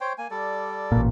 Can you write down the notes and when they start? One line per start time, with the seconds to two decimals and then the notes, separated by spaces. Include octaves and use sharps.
0.01 C5 C#5 G5
0.18 A#3 G#5
0.31 G3 A4 D5
0.92 A1 A#2